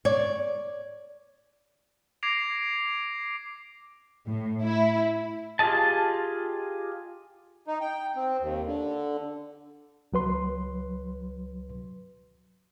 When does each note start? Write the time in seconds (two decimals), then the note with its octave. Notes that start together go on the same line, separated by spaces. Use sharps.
0.05 C#5 D5
2.23 D6 G#6 A#6 C7 D7 F7
4.27 A2
4.61 E4
5.59 F4 G4 G#4 D#5 A5
7.67 D#4
7.81 G5
8.16 C4
8.41 D#2
8.66 D3
10.13 C#2 F#3 B4 C6